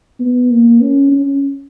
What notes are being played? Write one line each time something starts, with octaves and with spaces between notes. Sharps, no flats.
B3
A#3
C#4
C#4